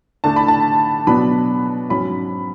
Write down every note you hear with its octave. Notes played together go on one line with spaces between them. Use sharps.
D3 A3 D4 A5
B5
A5
B2 F#3 B3 D4 B5
G#2 F#3 C#4 B5